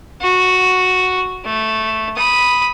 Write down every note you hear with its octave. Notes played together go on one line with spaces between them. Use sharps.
F#4
A3
B5 D#6